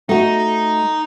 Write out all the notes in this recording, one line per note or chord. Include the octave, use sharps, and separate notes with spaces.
A3 D#4 F#4